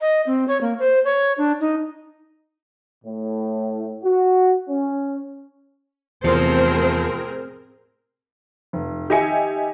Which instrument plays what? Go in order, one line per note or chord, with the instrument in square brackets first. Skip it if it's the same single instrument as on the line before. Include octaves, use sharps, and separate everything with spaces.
[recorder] D#5
C4
C#5
A#3
C5
C#5
D4
D#4
[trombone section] A2
F#4
C#4
[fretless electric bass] E2 [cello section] A2 C3 C5 [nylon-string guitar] F3 [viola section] C4 G#4 A#4
[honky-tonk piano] F1
D#3 G4 D#5 E5 G#5 C#7